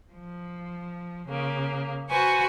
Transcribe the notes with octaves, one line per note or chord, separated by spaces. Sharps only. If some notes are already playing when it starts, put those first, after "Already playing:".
F3
C#3 A#3
F#4 B4 C5 G#5 C#6